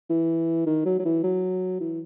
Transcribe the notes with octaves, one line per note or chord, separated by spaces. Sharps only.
E3
D#3
F#3
F#3
E3
F#3
E3